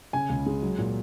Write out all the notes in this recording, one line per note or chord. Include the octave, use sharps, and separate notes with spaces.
C#3 G#5
C#2
G#3
F#3
A#2